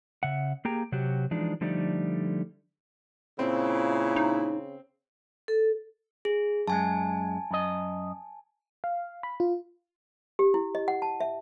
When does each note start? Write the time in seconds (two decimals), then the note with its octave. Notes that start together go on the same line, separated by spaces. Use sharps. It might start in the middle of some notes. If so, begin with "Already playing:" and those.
0.23 C#3 E5 F#5
0.65 A#3 G4 G#4 G5 A#5
0.92 C3 F#3 F#4 G4
1.31 E3 F3 G#3 D4 D#4
1.61 D3 F3 G3 A3 D#4 D5
3.39 A#2 C#3 C4 E4
4.16 D#4
5.48 A4
6.25 G#4
6.68 F#2 G#3 G#5 A5
7.51 F#2 D#5
8.84 F5
9.23 B5
9.40 F4
10.39 G4
10.54 E4
10.75 D#5
10.88 F#5
11.02 A5
11.20 E5